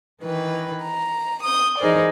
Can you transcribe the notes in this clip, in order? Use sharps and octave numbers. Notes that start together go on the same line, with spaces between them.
D#3 E3 B4
A#5
D#6 G6
E3 D#4 G#4 A#4 C5 D5